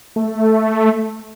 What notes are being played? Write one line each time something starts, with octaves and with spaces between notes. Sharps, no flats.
A3